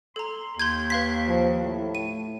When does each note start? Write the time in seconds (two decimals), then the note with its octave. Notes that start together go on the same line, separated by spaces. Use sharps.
0.16 A4 A#5 C6
0.59 D#2 C6 G6 G#6
0.90 B4 F5 B6
1.28 F3
1.62 A2
1.95 D#7